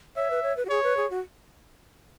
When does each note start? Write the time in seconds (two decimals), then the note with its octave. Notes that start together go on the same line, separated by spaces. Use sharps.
0.16 C#5 E5
0.30 B4
0.43 C#5
0.57 B4
0.65 F#4
0.69 G#4 C#5
0.84 B4
0.97 G#4
1.10 F#4